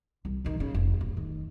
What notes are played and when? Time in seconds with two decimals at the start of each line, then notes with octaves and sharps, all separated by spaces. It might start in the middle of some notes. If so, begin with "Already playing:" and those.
0.25 C2
0.45 C3 D#3
0.60 C#3
0.74 F1
1.01 D1
1.17 D#3